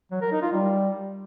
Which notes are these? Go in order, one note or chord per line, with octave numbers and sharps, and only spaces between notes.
F#3
A#4
D#4
F4
G3